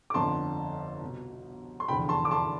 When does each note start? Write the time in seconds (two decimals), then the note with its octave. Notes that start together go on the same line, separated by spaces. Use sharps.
0.10 D6
0.14 G1 F2 D3 A5 C6
1.01 C2 B2
1.80 C6
1.88 F1 E2 D3 F3 G5 B5
2.09 A5 C6
2.25 D6
2.31 A5 C6